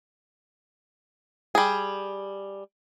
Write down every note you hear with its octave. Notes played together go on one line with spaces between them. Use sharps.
G3 G#4